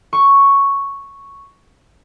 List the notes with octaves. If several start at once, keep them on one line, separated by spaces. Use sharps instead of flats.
C#6